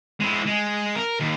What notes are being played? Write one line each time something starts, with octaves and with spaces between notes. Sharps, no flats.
G#3 E4
G#3
A#4
D#2